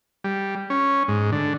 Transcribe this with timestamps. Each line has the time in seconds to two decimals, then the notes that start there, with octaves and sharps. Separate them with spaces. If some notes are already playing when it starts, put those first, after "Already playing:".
0.24 G3
0.70 C#4
1.08 G#2
1.32 D3